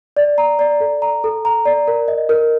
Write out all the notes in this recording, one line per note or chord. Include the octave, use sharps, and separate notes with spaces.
D5
A#5
D5
A4
A#5
A4
A#5
D5
A#4
D#5
A#4